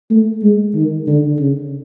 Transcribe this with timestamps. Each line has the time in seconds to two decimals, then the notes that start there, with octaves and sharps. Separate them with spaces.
0.11 A3
0.43 G#3
0.75 D#3
1.08 D3
1.40 C#3